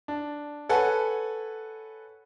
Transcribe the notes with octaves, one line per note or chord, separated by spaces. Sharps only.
D4
A4 B4 C#5 F#5 G#5